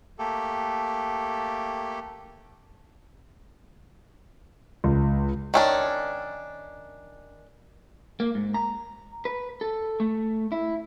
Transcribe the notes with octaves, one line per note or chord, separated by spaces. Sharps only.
A3 A#3 G4 A4
C#2
D#3 C#4 D4
A#3
G#2
A#5
B4
A4
A3
E4